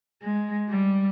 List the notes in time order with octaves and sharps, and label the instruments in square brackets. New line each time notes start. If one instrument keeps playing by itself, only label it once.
[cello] G#3
G3